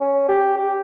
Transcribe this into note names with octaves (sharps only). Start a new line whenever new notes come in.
C#4
G4
G4